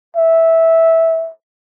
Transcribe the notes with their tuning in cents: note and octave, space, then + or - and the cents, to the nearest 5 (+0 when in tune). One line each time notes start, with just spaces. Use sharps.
E5 -10